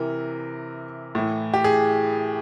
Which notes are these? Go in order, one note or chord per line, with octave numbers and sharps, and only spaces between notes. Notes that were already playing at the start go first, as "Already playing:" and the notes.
Already playing: C3 E3 A#4
A2 E3
G4
G#4